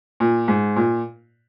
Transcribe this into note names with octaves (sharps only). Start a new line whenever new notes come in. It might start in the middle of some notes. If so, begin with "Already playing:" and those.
A#2
G#2
A#2